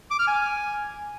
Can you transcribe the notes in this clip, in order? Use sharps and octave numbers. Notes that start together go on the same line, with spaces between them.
D6
F6
G#5